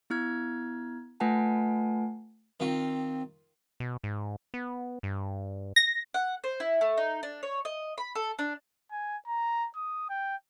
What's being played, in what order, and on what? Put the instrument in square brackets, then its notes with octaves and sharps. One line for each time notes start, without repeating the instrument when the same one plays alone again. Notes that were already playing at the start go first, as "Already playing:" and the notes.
[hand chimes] B3 E4 F6 G#6
A3 F4 B4 F#5 G#5 A5
[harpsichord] D#3 F4 [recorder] C4
[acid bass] B2
G#2
B3
G2
[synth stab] A#6
[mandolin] F#5
C5
E4
A3
D#4
D4
C#5
D#5
B5
A4
D4
[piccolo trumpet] G#5
A#5
D#6
G5